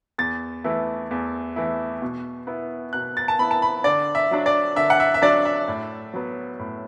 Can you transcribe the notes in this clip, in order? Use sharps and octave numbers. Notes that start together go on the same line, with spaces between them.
E2 A6
E3 A3 E4
E2
E3 A3 E4
B2
B3 E4
B2 F#6
A6
A5
B3 E4 B5
A5
B5
D3 D5
E5
F#3 D4
D5
D3 E5
F#5
E5
E5
F#3 D4 D5
E5
A2
F#3 B3
A2